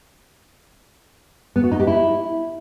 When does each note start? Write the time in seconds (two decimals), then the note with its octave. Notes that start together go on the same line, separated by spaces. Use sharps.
1.56 B3
1.64 F#4
1.72 D#4
1.79 G4
1.87 E4